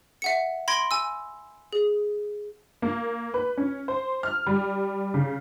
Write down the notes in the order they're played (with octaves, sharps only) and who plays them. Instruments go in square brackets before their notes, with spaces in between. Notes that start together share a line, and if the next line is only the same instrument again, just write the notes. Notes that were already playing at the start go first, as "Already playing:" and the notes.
[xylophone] E5 F#5 C#7
B5 C6 G#6 A#6 D7
G#5 E6
G#4
[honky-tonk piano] A#3
B4
C#4
C5
F6
G3
C#3